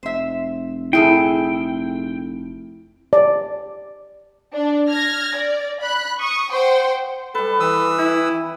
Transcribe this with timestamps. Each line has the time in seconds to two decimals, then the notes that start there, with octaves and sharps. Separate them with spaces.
0.03 F1 C5 E5
0.93 A#2 E4 G#4 A4 G5
3.13 D5
4.54 D4
4.90 F6 G#6 A#6
5.37 D5
5.81 B5 F#6
6.20 C#6 D#6
6.51 C5 F#5 G5 C6
7.35 G3 A4 B4
7.60 E3 D#6 E6
7.98 E4